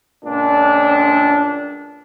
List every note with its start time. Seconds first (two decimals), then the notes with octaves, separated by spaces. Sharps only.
0.24 C#2 A#2 D4